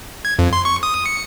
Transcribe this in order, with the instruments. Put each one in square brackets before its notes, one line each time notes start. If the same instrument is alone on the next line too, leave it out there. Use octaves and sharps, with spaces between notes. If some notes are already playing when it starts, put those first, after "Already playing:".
[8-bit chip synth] G#6
F2
C6
C#6
D#6
C#7